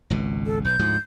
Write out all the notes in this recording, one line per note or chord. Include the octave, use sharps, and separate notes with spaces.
G#1 C#2 B2
A4
B1 G6
D2 G#2 F3